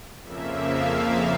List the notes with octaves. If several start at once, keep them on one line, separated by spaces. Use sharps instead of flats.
F2 C#3 F3 A#3 E5
F5
F5